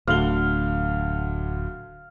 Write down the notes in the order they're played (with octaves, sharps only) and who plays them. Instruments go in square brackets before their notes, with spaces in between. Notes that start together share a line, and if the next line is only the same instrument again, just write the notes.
[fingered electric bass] D1 [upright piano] D2 D3 G7 [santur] F5